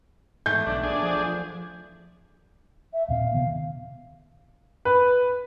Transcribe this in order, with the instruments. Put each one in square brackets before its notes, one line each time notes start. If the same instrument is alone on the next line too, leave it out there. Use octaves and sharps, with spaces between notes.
[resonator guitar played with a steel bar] E2 A3 [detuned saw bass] G#2 [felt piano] G6
[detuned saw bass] B1 [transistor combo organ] D4
[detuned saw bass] A#1 [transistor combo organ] D4 G#4
[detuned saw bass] F3
[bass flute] E5
[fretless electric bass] D#2 A#2 C4 [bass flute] F5
[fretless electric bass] C3 D#3 B3
[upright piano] B4